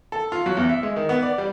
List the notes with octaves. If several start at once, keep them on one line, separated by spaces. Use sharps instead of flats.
A4
F4
F#3
E2
E5
G#3
D#3
B3
D5
G3